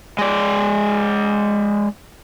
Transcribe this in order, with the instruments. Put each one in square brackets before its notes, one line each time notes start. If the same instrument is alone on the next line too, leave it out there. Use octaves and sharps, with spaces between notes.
[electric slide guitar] G#3 D5